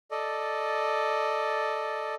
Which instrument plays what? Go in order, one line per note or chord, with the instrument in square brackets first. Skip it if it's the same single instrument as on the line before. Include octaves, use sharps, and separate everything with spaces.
[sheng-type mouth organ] A4 D5 D#5